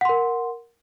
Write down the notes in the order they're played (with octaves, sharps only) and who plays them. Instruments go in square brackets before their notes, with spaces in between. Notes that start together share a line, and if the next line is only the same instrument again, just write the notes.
[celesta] F#5
C6
A#4